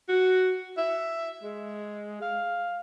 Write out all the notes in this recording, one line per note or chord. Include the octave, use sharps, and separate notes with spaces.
F#4
E5
G#3
F5